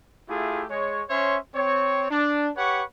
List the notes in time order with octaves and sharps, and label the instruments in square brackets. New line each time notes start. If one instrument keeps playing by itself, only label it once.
[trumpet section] A3 E4 F4 G4 G#4
G#3 C#5
C#4 C5 C#5 E5 C6
C4 C#5
D4
G4 B4 C#5 F#5 C#6